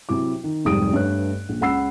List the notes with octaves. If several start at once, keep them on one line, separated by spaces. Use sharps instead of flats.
C3 F#3 E4 D6
D#3
F1 G#2 G3 D#6 D7
G2 A3 B4 C#5 F#6
A#1
C#2 C#4 F#5 B5 E6 C7